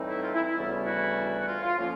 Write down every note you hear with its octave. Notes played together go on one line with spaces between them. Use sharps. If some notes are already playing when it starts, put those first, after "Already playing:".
Already playing: A2 E3 G3 C4 D#4
E4
F4
E4
E4
D2 C#3 E3 G3 B3
E4 F#4
F#4
F4
F4
D3 F3 A#3 C#4 F4